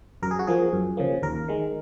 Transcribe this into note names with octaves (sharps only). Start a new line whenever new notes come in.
F#2 A#4
G#4
F#4
F3 A#3 G#4
F#2
C#3 F3 A#3
D#2 A#4
D#3 G#3